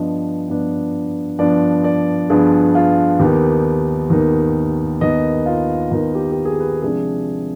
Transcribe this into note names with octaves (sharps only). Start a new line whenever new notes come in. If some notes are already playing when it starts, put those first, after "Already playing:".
Already playing: G2 F3 B3 D4 D#5
G2 F3 B3 D4
G2 F3 B3 D4 D5
D5
G2 F3 B3 D4 G#4
F4
D#2 D#3 B3 D#4 G4
D#2 D#3 B3 D#4
D#2 D#3 B3 D#4 D#5
F4
D#2 D#3 B3 D#4 F4
G4
G4
G#4
B4
C3 F3 G#3 D4 G#4